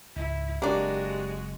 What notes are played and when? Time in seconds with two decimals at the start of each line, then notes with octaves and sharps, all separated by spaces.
0.16 C#2 G#2 E4
0.62 F#1 G#3 A#3 C4 D4 F#4 G4